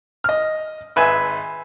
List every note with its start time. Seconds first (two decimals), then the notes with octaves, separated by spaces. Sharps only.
0.24 D#5 F6
0.96 G#1 B4 E5 G#5